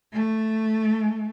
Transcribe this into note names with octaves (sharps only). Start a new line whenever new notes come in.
A3